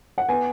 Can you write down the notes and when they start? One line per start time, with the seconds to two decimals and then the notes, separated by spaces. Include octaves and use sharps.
0.18 F#5
0.29 B3 G#5